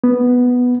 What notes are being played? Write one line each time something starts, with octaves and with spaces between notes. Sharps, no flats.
B3